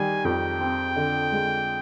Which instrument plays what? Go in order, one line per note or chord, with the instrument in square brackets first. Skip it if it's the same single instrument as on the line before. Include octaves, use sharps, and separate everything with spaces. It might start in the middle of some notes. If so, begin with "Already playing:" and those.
Already playing: [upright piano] D#3 G3 [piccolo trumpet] G#5
[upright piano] F2 [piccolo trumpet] G5
[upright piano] C4
D3
G#3